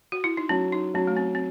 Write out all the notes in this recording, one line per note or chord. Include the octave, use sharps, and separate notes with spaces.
F#4
E4
D#4
F#3 C#4
D#4
F#3 C#4
A3
C4
C4